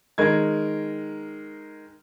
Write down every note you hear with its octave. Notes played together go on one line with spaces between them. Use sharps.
D#3 G#3 A#4 G#6